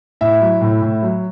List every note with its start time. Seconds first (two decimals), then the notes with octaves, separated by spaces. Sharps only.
0.21 A2 E4 E5
0.41 F#3
0.61 A2
0.82 A2
1.03 F#3